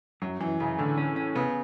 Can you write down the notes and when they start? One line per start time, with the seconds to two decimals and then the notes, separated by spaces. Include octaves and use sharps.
0.22 F#2 F#3
0.40 F#2 E3
0.60 F#2 C#3
0.79 A2 D3
0.98 C#4
1.16 C#4
1.35 C#3 B3